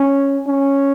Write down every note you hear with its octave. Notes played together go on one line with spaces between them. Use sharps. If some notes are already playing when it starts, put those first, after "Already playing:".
Already playing: C#4
C#4